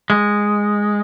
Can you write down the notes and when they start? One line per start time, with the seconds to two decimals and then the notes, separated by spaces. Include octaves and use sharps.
0.10 G#3